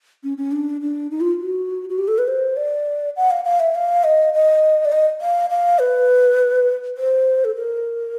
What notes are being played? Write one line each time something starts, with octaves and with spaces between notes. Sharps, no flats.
C#4
C#4
D4
D4
D#4
F4
F#4
F#4
G4
A4
B4
C5
D5
F#5
F5
F5
E5
F5
D#5
D#5
D5
D#5
F5
F5
B4
C5
A4
A#4